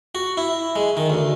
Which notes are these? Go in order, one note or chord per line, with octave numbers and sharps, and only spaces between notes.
F#4
E4
G#3
D#3
D2